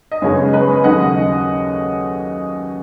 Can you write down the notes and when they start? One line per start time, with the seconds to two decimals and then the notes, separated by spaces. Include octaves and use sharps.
0.12 D#5
0.22 F#2 C#3 G#3 B3 C#5
0.53 B4 D#5
0.84 D#2 C#3 F#3 A3 D#5 F#5